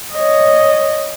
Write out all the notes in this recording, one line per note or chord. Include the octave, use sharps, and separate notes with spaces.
C#5 D#5